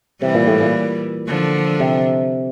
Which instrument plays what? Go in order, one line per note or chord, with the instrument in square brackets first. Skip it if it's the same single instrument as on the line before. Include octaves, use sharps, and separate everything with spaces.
[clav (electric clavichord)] C3 [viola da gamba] E3 G3
[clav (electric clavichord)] A#2
A2
A#2
[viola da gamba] D3 F3
[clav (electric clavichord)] C3